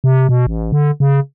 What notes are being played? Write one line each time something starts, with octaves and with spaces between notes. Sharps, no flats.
C3
B2
A1
D3
C#3